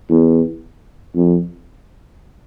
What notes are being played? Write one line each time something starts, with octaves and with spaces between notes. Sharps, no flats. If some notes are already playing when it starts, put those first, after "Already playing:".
E2
F2